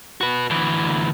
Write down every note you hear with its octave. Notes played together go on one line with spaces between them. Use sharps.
F#4 B4
D2 E3